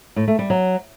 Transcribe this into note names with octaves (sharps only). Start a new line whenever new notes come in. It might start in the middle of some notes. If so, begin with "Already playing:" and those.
A2
A3
G3
F#3